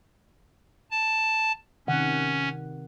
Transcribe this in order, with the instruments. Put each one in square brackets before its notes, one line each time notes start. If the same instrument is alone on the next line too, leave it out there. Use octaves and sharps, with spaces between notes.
[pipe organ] A5
[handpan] C3 D#3 F#5 [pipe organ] C#4